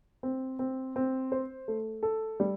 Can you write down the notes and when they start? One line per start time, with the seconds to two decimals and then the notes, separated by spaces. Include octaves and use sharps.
0.23 C4
0.59 C4
0.96 C4
1.32 C5
1.68 A3
2.03 A4
2.40 G3